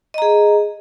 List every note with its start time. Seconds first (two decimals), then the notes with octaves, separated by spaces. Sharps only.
0.14 D#5
0.18 A#5
0.22 G#4